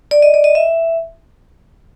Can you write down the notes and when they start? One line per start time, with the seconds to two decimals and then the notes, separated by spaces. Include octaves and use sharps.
0.11 D5
0.22 D#5
0.34 D5
0.44 D#5
0.55 E5